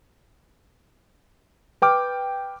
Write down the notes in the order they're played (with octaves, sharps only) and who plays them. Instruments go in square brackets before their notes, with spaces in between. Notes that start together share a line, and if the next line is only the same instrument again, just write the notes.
[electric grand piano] B4 G5 D6 F6